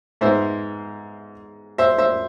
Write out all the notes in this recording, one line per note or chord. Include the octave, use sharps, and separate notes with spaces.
G#2 G#3 B3 C5 E5
C5 E5
C5 E5